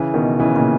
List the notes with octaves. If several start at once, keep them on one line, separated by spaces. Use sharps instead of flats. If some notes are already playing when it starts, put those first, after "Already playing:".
Already playing: C#3 E3
B2 D#3
C#3 E3
A#2 C#3